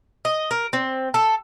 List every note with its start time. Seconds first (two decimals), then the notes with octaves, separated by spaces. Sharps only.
0.25 D#5
0.51 A#4
0.73 C4
1.14 A4